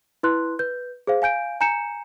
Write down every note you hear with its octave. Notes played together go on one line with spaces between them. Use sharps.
E4 B4 C6 F#6
B4 G6
G#4 C5 F5
F5 G#5 G6 D7
G#5 A#5 G6 C#7 E7